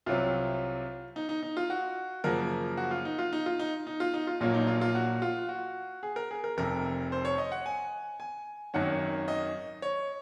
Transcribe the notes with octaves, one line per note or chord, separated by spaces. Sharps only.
C2 C3 F#3 F4
D#4
D#4
D#4
F4
F#4
F#2 C#3 F3 A#3 A#4
F#4
F4
D#4
F4
D#4
F4
D#4
D#4
F4
D#4
F4
A#1 A#2 F#3 A#3 F4
D#4
F4
F4
F#4
F4
F#4
G#4
A#4
G#4
A#4
F1 F2 C3 A#4
C5
C#5
D#5
F#5
G#5
G#5
G#1 F#2 D#3 F#3 F#5
D#5
C#5